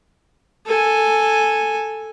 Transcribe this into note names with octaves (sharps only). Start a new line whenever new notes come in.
A4 G#5